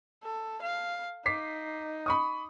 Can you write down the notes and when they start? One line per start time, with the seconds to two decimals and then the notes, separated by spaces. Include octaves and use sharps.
0.23 A4
0.62 F5
1.26 D#4 D6 B6 C7
2.06 B5 C#6 D#6